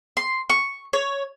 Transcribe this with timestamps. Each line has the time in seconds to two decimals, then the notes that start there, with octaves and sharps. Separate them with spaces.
0.17 C6
0.50 C#6
0.93 C#5